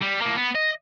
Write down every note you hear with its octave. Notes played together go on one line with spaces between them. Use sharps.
G3
A2 A#3
B3
D#5